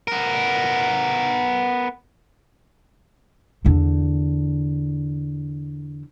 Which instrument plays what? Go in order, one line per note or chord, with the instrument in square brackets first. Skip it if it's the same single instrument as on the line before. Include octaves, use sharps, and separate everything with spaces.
[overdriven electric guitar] B3 A#4
[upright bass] E2 D3